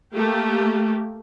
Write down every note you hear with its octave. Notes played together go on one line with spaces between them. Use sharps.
A3 A#3 G4